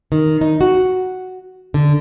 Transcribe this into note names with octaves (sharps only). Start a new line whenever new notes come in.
D#3
D#4
F#4
D3